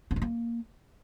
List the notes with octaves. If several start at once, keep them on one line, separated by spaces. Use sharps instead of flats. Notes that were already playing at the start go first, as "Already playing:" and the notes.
C4
D#4
A#3